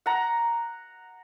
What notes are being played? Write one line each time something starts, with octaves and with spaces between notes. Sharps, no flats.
F#5 A#5